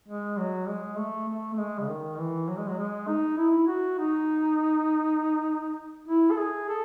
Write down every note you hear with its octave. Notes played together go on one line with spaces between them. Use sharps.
G#3
F#3
G#3
A3
A3
A3
G#3
C#3
D#3
E3
F#3
G#3
F#3
G#3
D#4
E4
F#4
D#4
E4
A4
G#4
A4